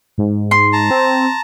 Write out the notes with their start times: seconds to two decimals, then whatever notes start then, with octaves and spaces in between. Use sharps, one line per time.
0.18 G#2
0.51 C6
0.73 A5 A#5
0.91 C4